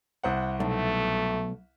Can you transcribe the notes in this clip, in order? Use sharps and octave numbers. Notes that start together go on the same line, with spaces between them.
C2 C5 F#5
B1 A3